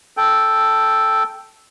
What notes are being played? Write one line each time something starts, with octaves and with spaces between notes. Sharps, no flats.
A4 G5